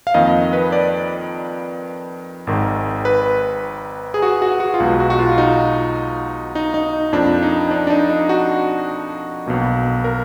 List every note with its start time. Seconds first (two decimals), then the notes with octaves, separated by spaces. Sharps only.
0.07 F5
0.14 F2 D#3 A#3 D#5
0.53 B4
0.72 D5
2.47 G#1 G#2 D#3
3.05 B4
4.14 G#4
4.22 F#4
4.42 F#4
4.60 F#4
4.74 F4
4.80 B1 B2 G#3 F#4
5.00 F#4
5.10 F#4
5.19 F4
5.32 F4
5.38 D#4
6.55 D#4
6.74 D#4
7.13 F2 F3 A#3 D4
7.43 D#4
7.71 D4
7.87 D4
7.90 D#4
8.10 D#4
8.29 F#4
9.46 B1 B2 A#3
10.04 A#4